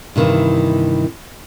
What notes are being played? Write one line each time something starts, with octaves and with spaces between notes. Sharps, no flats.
G2 C3 D#3 E3